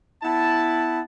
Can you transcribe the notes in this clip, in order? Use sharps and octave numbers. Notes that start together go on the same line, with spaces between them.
B3 E4 A5